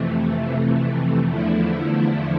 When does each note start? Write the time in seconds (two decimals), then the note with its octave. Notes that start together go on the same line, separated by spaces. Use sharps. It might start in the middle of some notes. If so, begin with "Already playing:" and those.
Already playing: F2 C3 E3 A3
1.28 E2 D3 F3 A3 E4